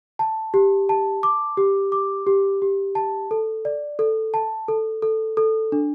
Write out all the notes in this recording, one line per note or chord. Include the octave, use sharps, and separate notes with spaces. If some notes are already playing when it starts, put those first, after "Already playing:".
A5
G4
A5
D6
G4
D6
G4
G4
A5
A4
D5
A4
A5
A4
A4
A4
D4